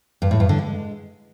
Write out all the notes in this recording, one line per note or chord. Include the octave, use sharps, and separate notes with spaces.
G2
A2
G2
D3
G#3